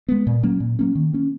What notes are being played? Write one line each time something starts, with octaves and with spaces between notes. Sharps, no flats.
G#3 B3
A#2
F#3 A#3 C#4
A#2
F#3 A#3 C#4
D#3
A#3 C#4